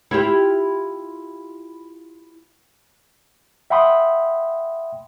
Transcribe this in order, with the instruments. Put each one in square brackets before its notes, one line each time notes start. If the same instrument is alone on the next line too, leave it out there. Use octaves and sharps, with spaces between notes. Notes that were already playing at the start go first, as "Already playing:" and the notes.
[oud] E4 F4 G4
[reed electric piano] E5 F#5 G5 B5 C6 D#6